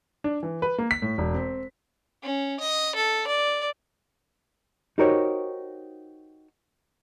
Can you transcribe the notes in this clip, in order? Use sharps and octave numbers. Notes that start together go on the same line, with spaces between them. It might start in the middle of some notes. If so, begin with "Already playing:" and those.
D4
E3
B4
A#3
B6
A2
E1
C4
C#4
D#5
A4
D5
D#4 F#4 G4 A#4 C5 C#5